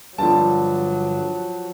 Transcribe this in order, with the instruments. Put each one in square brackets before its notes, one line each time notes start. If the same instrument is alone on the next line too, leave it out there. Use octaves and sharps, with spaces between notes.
[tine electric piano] G2 D3 [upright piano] F3 A5 [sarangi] F#3